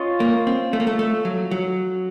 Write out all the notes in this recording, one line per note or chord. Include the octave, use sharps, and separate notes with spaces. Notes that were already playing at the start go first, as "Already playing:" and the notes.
Already playing: C#4 F4 D#5
A#3
C4
A3
A#3
A3
A3
F#3
F#3